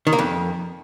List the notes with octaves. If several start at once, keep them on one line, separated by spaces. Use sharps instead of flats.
D#3
A#3
F2